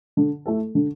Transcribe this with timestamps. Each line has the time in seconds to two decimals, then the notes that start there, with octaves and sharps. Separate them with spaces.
0.17 D3
0.46 A3 E4 A4
0.75 D3